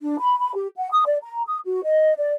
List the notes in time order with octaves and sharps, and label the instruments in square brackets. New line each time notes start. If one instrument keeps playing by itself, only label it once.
[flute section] D4
B5
B5
G4
F#5
D#6
D5
A#5
D#6
F#4
D#5
D5